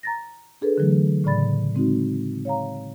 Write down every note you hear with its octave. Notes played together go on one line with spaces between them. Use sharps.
A#5 A6 A#6
D4 G#4 A4 B4
D3 E3 F#3 A3
A2 C#3 D5 B5 A6
G#3 C4 D#4 F#4
C#5 F5 A#5